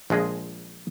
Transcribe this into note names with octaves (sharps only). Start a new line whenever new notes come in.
A#1 F3 G#3 G#4 D#5